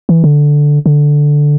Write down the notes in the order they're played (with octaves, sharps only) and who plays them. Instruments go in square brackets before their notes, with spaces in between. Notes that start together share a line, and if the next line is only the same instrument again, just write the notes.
[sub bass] E3
D3
D3